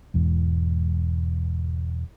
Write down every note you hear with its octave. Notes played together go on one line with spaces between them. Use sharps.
E1 E2 G#2